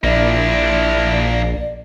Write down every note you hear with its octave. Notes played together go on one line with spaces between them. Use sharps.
A#1 A#3 D4 E4 D5